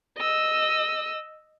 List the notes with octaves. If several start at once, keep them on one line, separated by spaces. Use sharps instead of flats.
D#5 E6